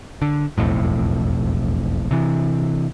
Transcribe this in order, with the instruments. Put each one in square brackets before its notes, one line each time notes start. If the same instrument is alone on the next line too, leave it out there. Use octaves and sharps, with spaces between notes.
[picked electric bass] D3
E1 B1 F2 A2
C3 E3